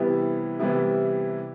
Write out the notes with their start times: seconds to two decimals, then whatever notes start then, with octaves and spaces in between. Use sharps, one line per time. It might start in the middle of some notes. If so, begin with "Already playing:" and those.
Already playing: C3 E3 G3 B3 E4
0.60 C3 E3 G3 B3 E4